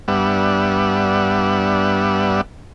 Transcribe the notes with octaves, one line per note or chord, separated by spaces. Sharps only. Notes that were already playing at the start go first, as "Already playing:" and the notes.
G2 G3 B3 D4 E5 F#5